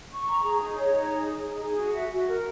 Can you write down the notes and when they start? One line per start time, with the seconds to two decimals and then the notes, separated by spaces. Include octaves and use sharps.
0.10 C#6
0.27 A#5
0.43 G#4
0.60 D#4
0.77 C#5
0.93 D#4
1.10 G#4
1.27 G#4
1.43 D#4
1.59 G#4
1.76 F#4
1.93 E5
2.10 F#4
2.27 A#4